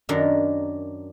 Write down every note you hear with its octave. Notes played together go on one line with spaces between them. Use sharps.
F#2 D#3 D4 A#4